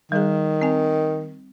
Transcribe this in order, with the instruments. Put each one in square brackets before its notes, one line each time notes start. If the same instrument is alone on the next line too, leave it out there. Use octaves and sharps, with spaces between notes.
[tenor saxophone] D#3 [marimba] G3 G#4
[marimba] C4 G#5